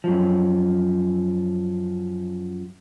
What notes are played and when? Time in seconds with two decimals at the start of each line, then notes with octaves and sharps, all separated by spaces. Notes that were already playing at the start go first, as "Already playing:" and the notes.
0.04 F#2 F3